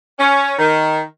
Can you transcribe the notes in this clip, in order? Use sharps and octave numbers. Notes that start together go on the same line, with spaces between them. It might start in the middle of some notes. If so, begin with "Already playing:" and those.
C#4
D#3